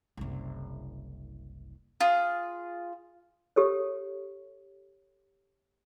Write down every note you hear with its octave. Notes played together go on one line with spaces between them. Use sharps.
F#1 C2
F4 G#4
G4 A4 C#5